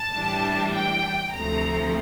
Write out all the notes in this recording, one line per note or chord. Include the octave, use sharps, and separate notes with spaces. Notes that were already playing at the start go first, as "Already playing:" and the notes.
Already playing: A5
A2 E3 G3 D4
G5
D2 C3 F3 A3 A#5